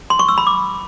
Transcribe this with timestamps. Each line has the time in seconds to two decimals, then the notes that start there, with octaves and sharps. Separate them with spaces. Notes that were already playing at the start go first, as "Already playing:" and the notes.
0.10 C6
0.19 C#6
0.28 E6
0.38 B5
0.47 D6